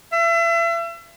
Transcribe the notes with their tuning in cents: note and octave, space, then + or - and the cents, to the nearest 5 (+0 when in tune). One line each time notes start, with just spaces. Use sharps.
E5 +35